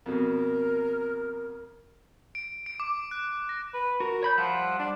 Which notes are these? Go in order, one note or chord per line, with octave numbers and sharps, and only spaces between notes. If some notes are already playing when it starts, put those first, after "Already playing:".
F2 B2 A#4
D7
D7
D6
F#6
A#6
B4
F#4 A#4
C#5 B5 G6
F3 G3 E5 F#5
D4